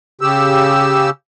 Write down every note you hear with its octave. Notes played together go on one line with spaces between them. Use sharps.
C#3 G4 E6